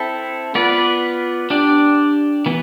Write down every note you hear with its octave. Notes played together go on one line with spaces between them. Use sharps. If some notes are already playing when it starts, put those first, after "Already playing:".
Already playing: C4 E4 A4
B3 F4 B4 D5
D4 G4 D5
E3 B3